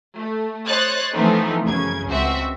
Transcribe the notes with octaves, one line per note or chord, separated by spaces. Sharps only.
A3
C5 C#5 D#5 F#6 A6
E3 F3 A3 B3 C4 D#4
F#2 C#3 G#6
C#2 C4 F#4 E5